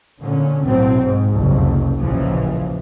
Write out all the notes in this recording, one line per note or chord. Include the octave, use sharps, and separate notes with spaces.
A#2 D3 C#4
B1 A2 F#3 C4
G#2
F#1 C2 F2
A1 D#2 A#2 C#3 E3 F3